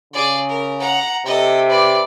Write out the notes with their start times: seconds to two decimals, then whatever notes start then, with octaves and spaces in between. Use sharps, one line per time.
0.13 C#3 G#4 D5
0.49 A#4
0.80 F#5 A#5
1.26 C3 A4 D#5
1.69 B4 D5